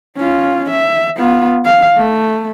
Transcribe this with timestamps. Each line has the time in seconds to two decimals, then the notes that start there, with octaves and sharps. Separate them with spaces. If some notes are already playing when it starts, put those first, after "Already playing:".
0.17 C#4 F4
0.71 E5
1.17 B3 F4
1.65 F5
1.96 A3